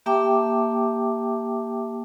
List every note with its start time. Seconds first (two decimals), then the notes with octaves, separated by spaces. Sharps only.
0.06 A#3 G4 E5 G5 A5 D6